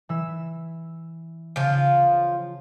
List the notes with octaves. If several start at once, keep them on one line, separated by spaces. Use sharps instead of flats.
E3 E5 E6
C#3 F3 F4